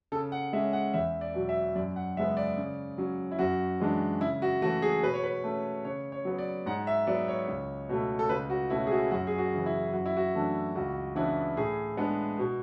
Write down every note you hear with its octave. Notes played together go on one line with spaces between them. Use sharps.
C#3 A4
F#5
G#3 C#4 E5
F#5
E2 E5
D5
B2 F#3
E5
F#2 D5
F#5
C#3 G#3 B3 E5
D5
C#3
F#3 C#4
E4
F#2 F#4
E3 G#3 D4
C#3 E4
F#4
E3 A3 F#4
G#4
B2 B4
C#5
B4
A3 C#4
C#3 C#5
C#5
F#3 B3
D5
G#2 F#5
E5
F#3 B3 D5
C#5
C#2
B2 A3
A4
C#2 B4
F#4
B2 A3 C#4 E4
G#4
F#4
F#2 F#4
G#4
F#4
C#3 E3
E4
F#2 F#4
E4
F#4
E3 A3 D4
C#2 F#4
C#3 E3 B3 D4 E4
A2 G#4
G#3 B3 D4
B2